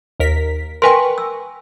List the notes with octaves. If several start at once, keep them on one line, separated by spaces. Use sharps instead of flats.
D#2 A#4 B6
A#4 B4 G5 G#5 C6 C#6
E6